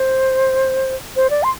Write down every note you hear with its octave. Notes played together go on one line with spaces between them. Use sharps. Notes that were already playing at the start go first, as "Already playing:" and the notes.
Already playing: C5
C5
D5
C6